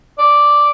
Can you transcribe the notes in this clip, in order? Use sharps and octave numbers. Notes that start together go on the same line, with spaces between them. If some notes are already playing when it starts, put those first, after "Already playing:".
D5